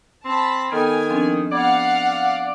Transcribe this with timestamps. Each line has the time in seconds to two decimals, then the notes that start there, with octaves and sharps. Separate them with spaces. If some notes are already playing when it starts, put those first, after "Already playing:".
0.25 C4 A5 B5
0.72 D#3 B3 A4 G5 G#5
1.10 F3 C4 D4
1.52 B3 D5 F5 F#5 G#6